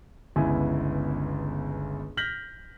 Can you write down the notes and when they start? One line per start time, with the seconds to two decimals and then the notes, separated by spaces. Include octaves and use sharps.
0.36 G1 C#2 B3 E4 G#5
2.17 F6 G6 A#6 B6 F#7